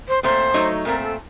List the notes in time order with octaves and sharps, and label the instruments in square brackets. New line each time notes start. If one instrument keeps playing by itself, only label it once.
[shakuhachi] C5
[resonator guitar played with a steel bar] A#2 A3 C4 [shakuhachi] C5
[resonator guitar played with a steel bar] F#3 A3 D#4
[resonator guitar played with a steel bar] A#2 A3 C4 [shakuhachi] A#4
[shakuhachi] A4